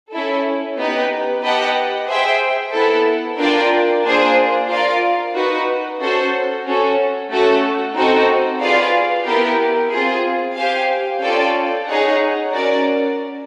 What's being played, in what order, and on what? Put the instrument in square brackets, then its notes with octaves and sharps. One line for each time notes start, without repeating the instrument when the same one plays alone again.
[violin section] C#4 E4 A4
B3 D#4 G4 B4
G4 B4 D#5 F#5 A5
G#4 C5 E5 G5
B3 E4 A4
D4 F4 A#4 D5 G5
A#3 D4 F4 G#4 C5
F4 A#4 D5 F5
D#4 F#4 B4
C#4 F#4 A4 C5
C#4 F#4 A4
A3 C#4 F#4 A4
C4 D#4 F#4 A4
F4 G#4 B4 D5 F5
B3 E4 G4 A#4
C4 F4 G#4
G4 C5 F5 G#5
C#4 F4 A4 D5 G5
D#4 G#4 C#5 F#5
C#4 F#4 A#4 D5